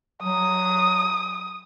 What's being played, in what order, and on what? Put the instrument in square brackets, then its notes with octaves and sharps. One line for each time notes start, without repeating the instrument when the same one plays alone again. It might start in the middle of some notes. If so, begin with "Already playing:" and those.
[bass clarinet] F#3 [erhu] D#6